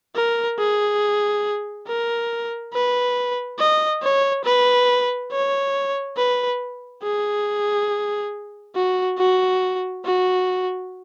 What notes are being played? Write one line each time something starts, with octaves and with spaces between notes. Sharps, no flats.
A#4
G#4
A#4
B4
D#5
C#5
B4
C#5
B4
G#4
F#4
F#4
F#4